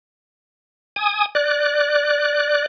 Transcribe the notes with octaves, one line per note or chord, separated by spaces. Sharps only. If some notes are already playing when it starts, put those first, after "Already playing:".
G#5 D#6
D5 F#6